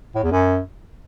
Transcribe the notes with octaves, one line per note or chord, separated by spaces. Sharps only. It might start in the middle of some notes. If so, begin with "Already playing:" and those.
A2
E2
F#2